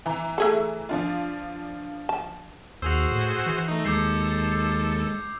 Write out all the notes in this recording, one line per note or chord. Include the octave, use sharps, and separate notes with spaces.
E3 A#5
A3 G#4 A4
F3 D4 F4
A5
D#2 F#4 G#4 C5 E6 F7
A2
E3
A3 D#4
D#2 G#3 A4 D6 G6 C7 C#7